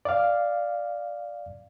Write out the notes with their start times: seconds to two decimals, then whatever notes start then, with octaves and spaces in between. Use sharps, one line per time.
0.05 D5 F5